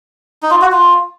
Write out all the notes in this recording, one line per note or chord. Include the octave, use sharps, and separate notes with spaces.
D#4
F4
F#4
F4